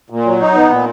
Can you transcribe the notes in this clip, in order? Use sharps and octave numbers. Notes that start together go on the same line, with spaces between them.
A#2
F#3
D#4
B3
A#2